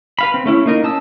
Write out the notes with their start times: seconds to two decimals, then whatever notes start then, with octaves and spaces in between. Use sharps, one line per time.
0.19 B4 F5 B5
0.34 C4
0.46 A3 C#4 E4
0.66 A#3 D#4 A#4
0.84 C#4 A5 D#6 E6